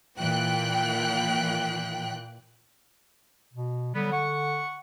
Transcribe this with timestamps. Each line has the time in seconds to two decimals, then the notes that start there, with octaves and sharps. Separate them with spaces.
0.19 A#2 E3 G5 F#6
3.53 B2
3.95 D3 F#3 G3 B3
4.12 F#5 C#6